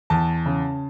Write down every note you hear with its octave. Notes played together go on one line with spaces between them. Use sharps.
E2 A5
C#3